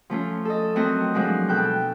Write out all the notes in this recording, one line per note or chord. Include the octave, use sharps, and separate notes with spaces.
F3 A3 C#4 F4
A4 D#5
F#3 A3 C4 F#4 A#4 D#5
F3 F#3 G#3 D4 D#4
B2 A4 G5 F#6 G6